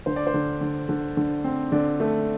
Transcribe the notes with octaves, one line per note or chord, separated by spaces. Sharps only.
D3 C5
D5
C5
D3
D3
D3
D3
C4
D3 D5
A3